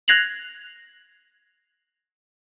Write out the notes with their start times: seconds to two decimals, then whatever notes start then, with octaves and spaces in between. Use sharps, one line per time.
0.08 F#6 G#6 A#6 C7 F7 F#7